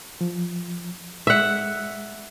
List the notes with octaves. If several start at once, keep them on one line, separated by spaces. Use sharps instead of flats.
F3
G#3 E5 F#5